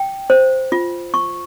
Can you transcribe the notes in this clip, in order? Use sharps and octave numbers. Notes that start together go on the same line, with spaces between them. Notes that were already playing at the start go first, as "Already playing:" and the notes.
Already playing: G5
C5
F4
C#6